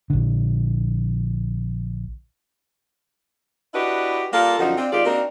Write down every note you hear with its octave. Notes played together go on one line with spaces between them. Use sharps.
A#1 D3
D4 E4 F#4 G4 B4 D#5
G3 A#3 F4 A4 A#4
F#2 D3 F3 D#4 F#4
C4 D4 F4
D#3 G#3 F4 G4 G#4 D5
A#3 C4 D4 D#4 F#4 A#4